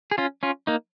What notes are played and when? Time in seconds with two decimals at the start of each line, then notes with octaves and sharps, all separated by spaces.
0.11 G#4
0.18 C#4 F4
0.43 C#4 F4
0.67 A#3 D#4